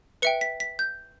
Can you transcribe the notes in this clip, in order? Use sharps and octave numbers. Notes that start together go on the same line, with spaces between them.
B4 E5 G5 C#7
B6
B6
G6